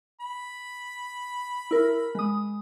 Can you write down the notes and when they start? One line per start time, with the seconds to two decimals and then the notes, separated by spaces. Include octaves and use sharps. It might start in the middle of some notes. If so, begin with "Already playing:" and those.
0.21 B5
1.71 E4 A#4
2.15 G#3 D#6